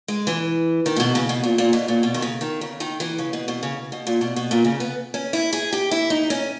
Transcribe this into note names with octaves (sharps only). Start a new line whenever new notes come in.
G#3
E3
D#3
A#2
B2
C#3
B2
A#2
A#2
B2
A#2
B2
D#3
C#3
D#3
C#3
D#3
E3
C#3
B2
B2
C#3
B2
A#2
B2
B2
A#2
C#3
B3
C#4
E4
G#4
G4
E4
D#4
C#4